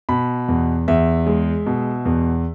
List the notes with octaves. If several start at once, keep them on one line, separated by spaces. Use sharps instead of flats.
B2 B5
E2
E2 E5
G#3
B2
E2